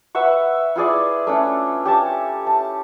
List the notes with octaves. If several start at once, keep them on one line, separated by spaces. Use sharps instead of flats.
B4 E5 F#5 C#6
E4 F4 G#4 D5
A3 C#4 D4
G4 C#5 A5
A5